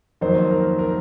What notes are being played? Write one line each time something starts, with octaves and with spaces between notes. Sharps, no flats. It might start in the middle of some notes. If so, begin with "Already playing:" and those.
F2 D#3 F#3 A#3 C5
A#4
A#4